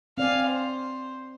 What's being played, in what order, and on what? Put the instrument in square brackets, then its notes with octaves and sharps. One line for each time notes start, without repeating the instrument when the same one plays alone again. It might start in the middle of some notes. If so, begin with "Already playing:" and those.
[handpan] C4 D5 [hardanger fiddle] F5 G#5
[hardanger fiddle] C5